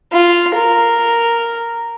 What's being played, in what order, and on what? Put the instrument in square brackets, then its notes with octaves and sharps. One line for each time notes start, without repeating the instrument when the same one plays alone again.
[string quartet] F4
A#4